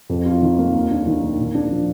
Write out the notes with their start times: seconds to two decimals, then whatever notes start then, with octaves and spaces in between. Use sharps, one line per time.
0.09 F2
0.26 F4
0.42 D#3
0.59 A#3
0.74 D#2
0.90 D4
1.06 D#3
1.23 A#3
1.39 A#2
1.55 D4
1.71 F3